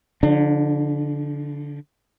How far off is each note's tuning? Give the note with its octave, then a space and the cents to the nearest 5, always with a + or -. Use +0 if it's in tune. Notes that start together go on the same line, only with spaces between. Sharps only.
D3 -25 F3 +0 D4 +35